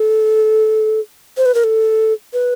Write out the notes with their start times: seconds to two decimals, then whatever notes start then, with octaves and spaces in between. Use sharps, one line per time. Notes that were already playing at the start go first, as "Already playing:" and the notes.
Already playing: A4
1.37 C5
1.46 B4
1.55 A#4
1.64 A4
2.33 B4